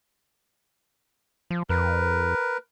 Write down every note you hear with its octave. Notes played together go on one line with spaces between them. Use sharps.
F3
F2 A#4 B4